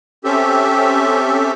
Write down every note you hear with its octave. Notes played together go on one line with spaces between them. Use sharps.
C4 C#4 G4 A4 E5